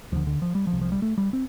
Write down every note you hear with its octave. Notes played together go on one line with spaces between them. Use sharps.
D2 D3 F3
D3
F3
G3
F3
C2 C3
F3
G3
A3
G3
C4